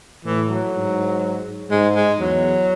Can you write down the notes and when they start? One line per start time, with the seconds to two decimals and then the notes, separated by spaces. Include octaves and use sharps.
0.25 A2 E3
0.49 F#3
0.74 G#2
1.70 G#2 G#3
1.95 G#3
2.19 E2 F#3